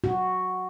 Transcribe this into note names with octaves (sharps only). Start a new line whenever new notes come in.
F#4